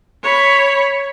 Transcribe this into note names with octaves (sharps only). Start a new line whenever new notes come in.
C#5 B5